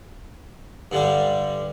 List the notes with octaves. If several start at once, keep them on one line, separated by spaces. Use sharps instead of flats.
G2 D3 G3